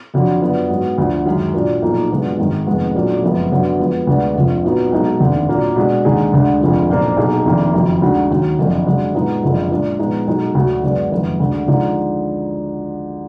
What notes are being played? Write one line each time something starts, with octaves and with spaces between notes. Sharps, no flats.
F2 D3 F#3
F#2 F3 B3 D4
G#2 F#3 B3
D2 D3 F3
F#2 D#3 G#3
A#2 F#3 D4 F4 A#4
B1 A#2 F3 A#3 D#4
F#2 D3 G#3 B3 F4
G#1 G#2 D#3 G#3
F1 F2 D#3 G#3 B3
B1 A#2 F#3 A#3 D4
F#1 F2 F3 G#3 B3
F#2 D3 F#3 B3
F2 F3 G#3 B3
D2 D3 G#3 B3 D4
F1 F2 D3 F3
A#2 F#3 B3 D#4 F#4
B1 B2 G#3 D#4
F1 D#2 D3
A#2 F#3 A#3 D4
B2 G#3 D4 G#4
D#2 D3 G#3 D#4 G#4
D2 D3 G#3
F1 F2 D3 F3 G#3
B1 A#2 F3 A#3 D4
B1 B2 A#3 D#4 G#4
F1 F2 D#3 A#3 D4
F#1 F2 D#3 F#3
D2 D3 G#3 D#4 F#4
D#2 D#3 F#3
F#1 F2 D3
F#2 D3 G#3
A#2 G#3 B3 D#4
F#1 F2 D3 F3 G#3
A#2 G#3 D4 F4 A#4
A#2 F3 G#3 B3 D#4
B1 B2 G#3 D#4
D2 D3 F#3 D4 F#4
F#2 D3 G#3 B3 D4
F#1 F2 D#3 G#3 B3
D2 D3 G#3
D3 F3 G#3 D#4